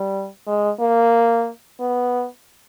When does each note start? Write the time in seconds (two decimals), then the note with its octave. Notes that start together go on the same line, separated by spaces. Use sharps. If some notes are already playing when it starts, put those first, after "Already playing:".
Already playing: G3
0.47 G#3
0.80 A#3
1.80 B3